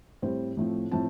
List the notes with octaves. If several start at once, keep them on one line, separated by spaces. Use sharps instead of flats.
A2 G3 C4 C5
A2 F3 A3 C4
A2 F3 C4 A5